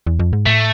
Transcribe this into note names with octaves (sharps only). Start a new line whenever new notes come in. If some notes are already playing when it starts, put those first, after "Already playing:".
E2
F2
G#2
A2 A3